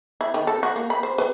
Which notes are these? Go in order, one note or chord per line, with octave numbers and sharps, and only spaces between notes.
E4
D#3
A4
F#4
A#3
B5
C5
B4